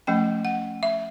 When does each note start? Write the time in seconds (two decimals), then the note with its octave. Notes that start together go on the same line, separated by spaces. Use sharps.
0.07 F3 A3 C#4 G5
0.45 F#5
0.83 E5